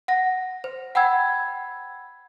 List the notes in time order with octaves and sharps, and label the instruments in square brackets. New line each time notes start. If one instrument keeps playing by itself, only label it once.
[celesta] F#5 A#6
C5
F#5 G5 B5 E6 G#6